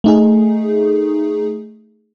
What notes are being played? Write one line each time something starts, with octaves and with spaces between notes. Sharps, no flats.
A3 D#4 G#4